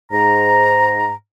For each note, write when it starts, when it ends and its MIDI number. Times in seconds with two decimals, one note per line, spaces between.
0.11 1.12 44
0.11 1.12 82